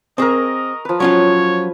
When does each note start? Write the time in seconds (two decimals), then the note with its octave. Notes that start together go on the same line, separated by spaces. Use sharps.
0.18 C4 G#4 A#4 D#5 C#6
0.85 F3 B4
1.00 F#3 C#4 F4 C#5